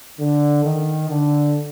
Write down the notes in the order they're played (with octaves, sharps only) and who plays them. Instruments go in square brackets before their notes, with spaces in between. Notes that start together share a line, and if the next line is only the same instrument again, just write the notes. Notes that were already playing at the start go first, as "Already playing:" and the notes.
[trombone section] D3
D#3
D3